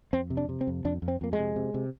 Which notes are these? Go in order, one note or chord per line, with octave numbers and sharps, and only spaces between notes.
F2 C4
C3
D4
C3
C4
F2
F2 D4
F2
C4
F2 A#3
G#3
C3
C3
C3